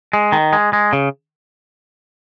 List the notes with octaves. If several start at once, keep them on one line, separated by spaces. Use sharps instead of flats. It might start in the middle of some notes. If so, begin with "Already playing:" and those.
G#3
D#3
G#3
G#3
C#3